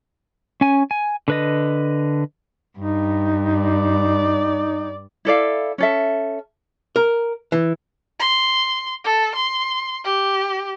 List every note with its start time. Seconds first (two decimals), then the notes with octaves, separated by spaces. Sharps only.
0.61 C#4 G#5
0.91 G#5
1.28 D3 B4 D#5
2.79 G2 D#4
3.60 D5
5.25 E4 A4 D5 F5
5.78 C#4 A4 E5
6.96 A#4
7.52 E3
8.20 C6
9.04 A4
9.35 C6
10.04 G4